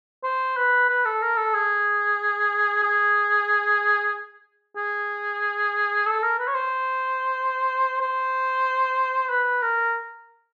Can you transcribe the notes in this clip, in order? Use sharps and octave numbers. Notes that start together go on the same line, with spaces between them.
C5
B4
B4
A4
A#4
A4
G#4
G#4
G#4
A4
A#4
B4
C#5
C5
C5
B4
A#4